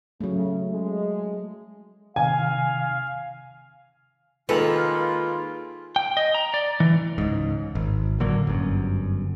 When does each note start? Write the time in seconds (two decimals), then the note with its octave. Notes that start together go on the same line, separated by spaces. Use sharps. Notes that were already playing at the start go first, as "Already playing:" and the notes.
0.21 C#3 F#3 A3
0.72 G#3
2.16 C3 D#3 F5 G#5
4.49 D#3 G#3 A#3 F4 A4 B4 A#5 B5
5.96 G5
6.17 D#5
6.34 A#5
6.54 D5
6.80 E3
7.18 C#2 G#2
7.75 G#1
8.20 A2 D3 F#3 A#3
8.47 G1 F#2